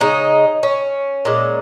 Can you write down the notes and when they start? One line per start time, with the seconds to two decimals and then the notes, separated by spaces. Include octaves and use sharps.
0.01 C#3 G#3 D#4
0.63 C#4
1.25 A#2 G#3